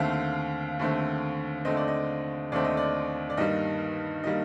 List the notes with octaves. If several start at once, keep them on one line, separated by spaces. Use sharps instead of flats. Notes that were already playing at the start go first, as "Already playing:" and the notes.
Already playing: D#2 D3 A3 C4 F5
D#2 D3 A3 C4
D#2 D3 A3 C4 D#5
D5
D#5
D#2 D3 A3 C4 D5
D#5
D5
D5
G2 D#3 G3 A#3 D#5
D#3 G3 A#3 D#5